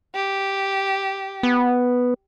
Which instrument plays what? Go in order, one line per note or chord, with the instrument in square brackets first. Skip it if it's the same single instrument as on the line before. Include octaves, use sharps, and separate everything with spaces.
[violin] G4
[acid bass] B3